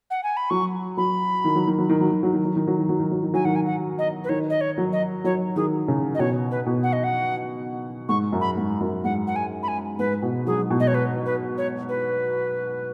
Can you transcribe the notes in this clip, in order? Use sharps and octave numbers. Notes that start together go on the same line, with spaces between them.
F#5
G#5
B5
F#3 C#6
F#3 B5
D#3
F#3
D#3
F#3
D#3
F#3
D#3
F#3
D#3
F#3
D#3
F#3
D#3
F#3
D#3
F#3
D#3
F#3 G#5
D#3 F#5
G#5
F#5
D#5
B4
D#3 C#5
D#5
C#5
F#3
D#5
F#3 C#5
D#3 G#4
C#3
D#5
B2 C#5
B4
B2
F#5
D#5
F#5
G#2 C#6
F#2
B5
G#2
F#2
G#2 F#5
F#5
G#5
B5
G#5
G#2 B4
B2
F#3 G#4
B2
D#5
C#5
B4
B4
C#5
B4